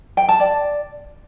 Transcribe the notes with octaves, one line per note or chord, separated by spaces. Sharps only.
G5
A5
D5